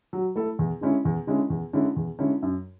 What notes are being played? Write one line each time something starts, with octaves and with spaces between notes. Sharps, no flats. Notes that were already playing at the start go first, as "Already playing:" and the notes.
F#3
A3 E4 A4
E2
D3 G#3 C#4 E4
E2
D3 G#3 C#4 E4
E2
D3 G#3 C#4 E4
E2
D3 G#3 C#4 E4
F#2